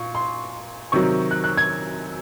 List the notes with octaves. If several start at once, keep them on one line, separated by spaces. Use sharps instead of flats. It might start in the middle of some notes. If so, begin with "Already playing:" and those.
Already playing: A#2 C#6
C6
C3 D#3 F#3 C#6
F#6
F#6
G#6